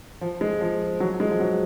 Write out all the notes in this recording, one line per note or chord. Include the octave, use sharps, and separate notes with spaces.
F3
G#3
F3
F#3
G#3
F3
F#3